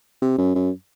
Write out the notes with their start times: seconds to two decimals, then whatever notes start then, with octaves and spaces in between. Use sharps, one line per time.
0.22 C3
0.38 F#2
0.55 F#2